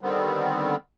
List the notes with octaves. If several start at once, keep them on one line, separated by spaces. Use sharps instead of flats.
D3 D#3 G3 B3 C4